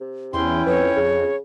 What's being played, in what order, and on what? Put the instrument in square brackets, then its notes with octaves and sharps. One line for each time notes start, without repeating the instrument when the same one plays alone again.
[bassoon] C3
[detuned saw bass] E2 [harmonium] C#4 E4 G5 [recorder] C6
[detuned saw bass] F2 [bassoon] B3 [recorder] C#5
[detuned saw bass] F2 [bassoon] C#3